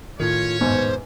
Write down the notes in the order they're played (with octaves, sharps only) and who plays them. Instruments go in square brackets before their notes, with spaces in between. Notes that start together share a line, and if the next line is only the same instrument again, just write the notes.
[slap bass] A2 D#3 [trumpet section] C#4 C#5 [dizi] F4
[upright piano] E2 G#2 B2 [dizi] C5